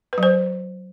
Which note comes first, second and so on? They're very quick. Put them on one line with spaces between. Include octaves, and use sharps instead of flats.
B4 F#3 C5